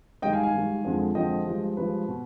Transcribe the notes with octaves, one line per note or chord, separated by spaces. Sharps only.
G#2 D#3 G3 D#5 G5
F5 G#5
F5 G#5
G#2 D#3 G3
F2 D3 F3 G#3
F2 D3 F3 G#3 D#5 G5
G2 F3 G#3
G2 F3 G#3 B4
B2